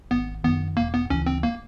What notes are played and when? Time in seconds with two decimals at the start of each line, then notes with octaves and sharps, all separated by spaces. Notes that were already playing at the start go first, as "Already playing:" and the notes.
0.11 G#1 B3
0.44 F#2 D#3 B3
0.77 E1 A#3
0.94 B3
1.10 D2 C#3 E3 C#4
1.26 C4
1.43 A#3